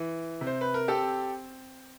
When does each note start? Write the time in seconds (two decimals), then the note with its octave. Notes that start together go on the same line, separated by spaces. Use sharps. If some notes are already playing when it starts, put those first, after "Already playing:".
Already playing: E3
0.41 C3
0.47 C5
0.61 B4
0.74 A#4
0.88 C4 G4 A4